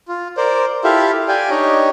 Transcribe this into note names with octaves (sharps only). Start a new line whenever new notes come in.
F4
A#4 C5 D5
E4 F4 G4 A4 E5 F5
G4 D5 F5 G5 G#5
D4 D#4 G4 C#5 D#5